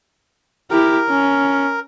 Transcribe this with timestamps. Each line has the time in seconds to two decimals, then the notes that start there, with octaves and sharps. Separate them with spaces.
0.70 E4 G4 A#4
1.09 C#4